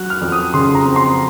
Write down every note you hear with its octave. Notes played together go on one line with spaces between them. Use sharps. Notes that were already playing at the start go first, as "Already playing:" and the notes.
Already playing: F#3 F#6
F6
F2
D#6
C#3 C6
A#5
C4
C6